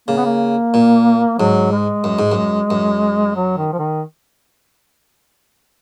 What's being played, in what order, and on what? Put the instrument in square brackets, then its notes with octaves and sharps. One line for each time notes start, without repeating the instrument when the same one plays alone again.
[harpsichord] C#3 [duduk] A#3
[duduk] B3
A#3
[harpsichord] A#2
[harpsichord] G#2 [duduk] F#3
[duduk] G#3
[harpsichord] F#2
G#2
F#2
F#2
[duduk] F#3
D#3
F3
D#3